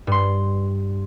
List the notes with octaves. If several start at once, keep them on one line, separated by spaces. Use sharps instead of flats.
G2 C6